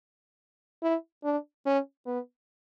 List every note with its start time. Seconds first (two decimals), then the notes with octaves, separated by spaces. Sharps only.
0.83 E4
1.24 D4
1.66 C#4
2.06 B3